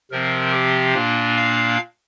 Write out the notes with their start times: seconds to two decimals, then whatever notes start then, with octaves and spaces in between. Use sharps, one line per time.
0.11 C3 F3 C4 A#4
0.52 G4
0.94 A#2 A#3 D4 F4
1.37 F5